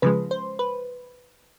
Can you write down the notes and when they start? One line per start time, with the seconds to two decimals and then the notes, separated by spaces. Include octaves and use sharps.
0.02 C#3 F3 G#3 B4
0.31 C5
0.59 B4